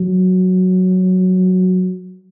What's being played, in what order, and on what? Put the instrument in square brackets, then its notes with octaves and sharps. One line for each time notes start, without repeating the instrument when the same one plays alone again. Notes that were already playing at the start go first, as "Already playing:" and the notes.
Already playing: [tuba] F#3